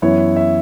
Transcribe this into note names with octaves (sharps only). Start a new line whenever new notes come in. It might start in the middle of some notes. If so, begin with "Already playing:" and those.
F#2 E3 B3 E4 C#5
E5